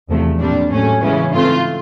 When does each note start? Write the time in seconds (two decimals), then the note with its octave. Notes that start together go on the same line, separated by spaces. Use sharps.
0.08 E2 C3 F3 A3
0.40 A#2 G3 C4 D4
0.71 A2 F#3 A3 C#4
1.02 C#3 E3 G#3 B3 C#4
1.33 G#2 E3 A3 C4 F4